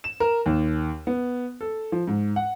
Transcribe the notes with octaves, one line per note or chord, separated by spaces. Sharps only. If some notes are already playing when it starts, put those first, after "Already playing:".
E7
A#4
D#2
B3
A4
F3
G#2
F#5